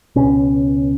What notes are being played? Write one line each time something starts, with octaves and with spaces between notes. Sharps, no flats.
C#2 B2 C#4